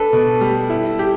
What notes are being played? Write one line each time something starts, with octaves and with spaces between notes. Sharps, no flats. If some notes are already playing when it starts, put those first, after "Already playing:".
Already playing: D4 A4 B4
B2
G3
E4
G4